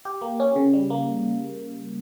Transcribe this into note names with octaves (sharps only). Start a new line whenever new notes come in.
G4
A#3
C#4
C#3
G3
A#3